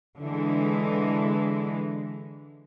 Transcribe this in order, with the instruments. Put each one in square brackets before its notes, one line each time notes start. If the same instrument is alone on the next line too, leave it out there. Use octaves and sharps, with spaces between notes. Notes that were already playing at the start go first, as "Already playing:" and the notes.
[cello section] D3 E3 G#3